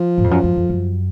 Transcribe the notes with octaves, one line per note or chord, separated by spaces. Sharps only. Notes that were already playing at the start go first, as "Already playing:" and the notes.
Already playing: F3
G#2
F2
F#2
F#2
F2
F#2